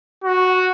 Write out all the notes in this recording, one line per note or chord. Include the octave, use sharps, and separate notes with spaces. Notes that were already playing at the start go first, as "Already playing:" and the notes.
F#4